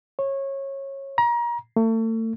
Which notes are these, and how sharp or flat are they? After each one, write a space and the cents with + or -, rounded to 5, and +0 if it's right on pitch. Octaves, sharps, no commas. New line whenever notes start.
C#5 -20
A#5 +30
A3 +35